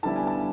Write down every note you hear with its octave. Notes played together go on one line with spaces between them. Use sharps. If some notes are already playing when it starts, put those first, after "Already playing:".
D3 G3 B3 E4 A5
G#5
A5